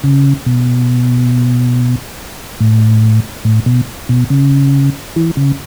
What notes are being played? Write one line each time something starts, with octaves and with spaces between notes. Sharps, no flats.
C#3
B2
A2
A2
B2
B2
C#3
E3
C#3